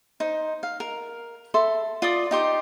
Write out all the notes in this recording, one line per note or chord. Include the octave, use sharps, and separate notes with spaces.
D#4 C5
F5
A#4
A4 E5 C6
F4 D5 C6 D#6
D#4 G4 C6 D#6